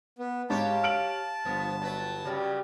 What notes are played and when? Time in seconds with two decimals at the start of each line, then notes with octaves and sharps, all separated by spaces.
0.19 B3
0.50 G#2 G4 C#5 F5 A5
0.84 F6 D7 F#7
1.45 G1 G2 F3 B3
1.82 F#3 B4
2.25 C#3 F#3 G3 G4